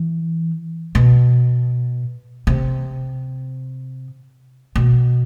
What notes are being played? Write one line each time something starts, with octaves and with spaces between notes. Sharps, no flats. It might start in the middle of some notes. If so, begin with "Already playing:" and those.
Already playing: E3
B2
C3
B2